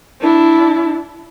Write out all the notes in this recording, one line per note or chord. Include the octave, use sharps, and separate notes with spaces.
D4 E4